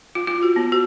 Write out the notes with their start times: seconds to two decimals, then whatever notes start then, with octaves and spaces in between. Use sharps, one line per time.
0.15 F4
0.27 F4
0.43 F#4
0.56 B3
0.72 F#4